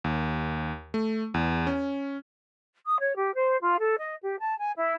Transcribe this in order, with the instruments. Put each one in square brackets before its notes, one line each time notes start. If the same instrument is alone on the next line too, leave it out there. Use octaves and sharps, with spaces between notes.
[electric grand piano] D#2
A3
E2
C#4
[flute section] D#6
C#5
G4
C5
F4
A4
D#5
G4
A5
G#5
E4